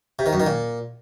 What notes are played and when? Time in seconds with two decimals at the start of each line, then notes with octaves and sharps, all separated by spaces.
0.19 C3
0.26 D#3
0.33 F#2
0.40 D#3
0.47 A#2